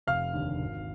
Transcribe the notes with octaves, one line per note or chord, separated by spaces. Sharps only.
F1 F5 F6
D#2 D3
G#1